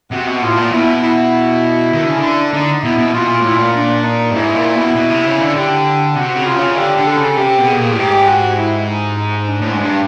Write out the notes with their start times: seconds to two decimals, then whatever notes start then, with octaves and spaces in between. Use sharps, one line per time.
0.11 C3 F#4
0.27 B2
0.41 A2 F4
0.57 A#2
0.72 B2 E4
1.01 E4
1.93 D#3
2.01 D3
2.10 C#3
2.18 D3
2.53 D3 D#4
2.83 B2 E4
2.98 B2
3.13 B2 F4
3.27 A#2
3.41 A2
3.55 A#2
3.74 D4
4.04 D#4
4.30 G2
4.35 G#2 E4
4.54 A#2
4.75 B2
4.95 B2
5.10 C3
5.26 C#3
5.40 D3
5.55 D3 G4
6.16 C3 F#4
6.36 C#3
6.46 F4
6.51 C3
6.57 C#3
6.76 D3 G4
6.97 D3
7.07 A4
7.17 C#3
7.37 C3 G4
7.58 B2
7.67 G#4
7.78 A#2
7.91 A2
7.98 G#2 G4
8.27 F#4
8.57 E4
8.89 D#4
9.19 D#4
9.49 D4
9.61 A2
9.70 G#2
9.80 G2